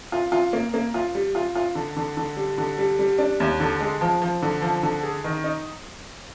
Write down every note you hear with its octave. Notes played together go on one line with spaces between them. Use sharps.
F4
F4
A#3
A#3
F4
G3
F4
F4
D3
D3
D3
G3
D3
G3
G3
D4
D#2
D3
G#3
F3
F3
D3
F3
D3
G#4
D#3
D#4